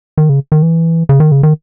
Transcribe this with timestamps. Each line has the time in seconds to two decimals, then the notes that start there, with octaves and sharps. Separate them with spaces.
0.18 D#3
0.29 C#3
0.52 D#3
0.62 E3
1.09 C#3
1.20 D#3
1.32 C#3
1.43 D#3